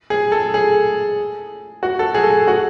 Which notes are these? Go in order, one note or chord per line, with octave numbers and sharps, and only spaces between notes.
G#4
A4
G#4
F#4
A4
G#4
A4
G#4
F#4